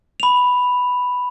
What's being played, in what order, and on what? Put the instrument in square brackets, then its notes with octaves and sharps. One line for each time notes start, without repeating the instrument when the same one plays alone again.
[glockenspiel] B5 F7